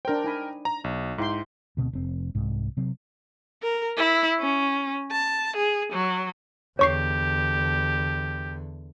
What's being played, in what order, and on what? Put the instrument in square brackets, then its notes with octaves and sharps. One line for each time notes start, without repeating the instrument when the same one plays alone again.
[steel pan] D4 C5 [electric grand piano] A#4 G5
[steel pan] D#4 G#5 B5
[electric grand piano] A#5
B1
[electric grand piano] G#2 [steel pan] E4 G5 C6
[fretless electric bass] D2 B2 C4
F1 C4
C2 G#2
C3 F#3 C4
[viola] A#4
E4
C#4
A5
G#4
F#3
[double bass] E2 D3 [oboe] G4 [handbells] C#5 C#6 C7